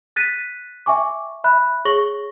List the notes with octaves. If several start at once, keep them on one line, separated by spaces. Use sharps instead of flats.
F#6 A6 B6 D#7
E5 G5 G#5 C#6 D6
E5 B5 F#6
G#4 C#5 C#6 A#6 F#7 G7